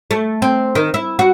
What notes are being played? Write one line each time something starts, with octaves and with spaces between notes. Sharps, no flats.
A3
C4
D#3
E4
F#4